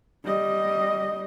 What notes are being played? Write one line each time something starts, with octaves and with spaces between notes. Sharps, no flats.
G3 D#5